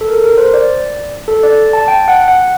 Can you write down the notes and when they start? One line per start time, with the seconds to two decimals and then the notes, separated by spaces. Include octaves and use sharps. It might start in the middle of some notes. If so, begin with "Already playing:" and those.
0.01 A4
0.08 A#4
0.24 A#4
0.38 C5
0.54 D5
1.28 A4
1.43 D5
1.73 A5
1.84 A5
1.88 G5
2.08 F#5
2.28 F#5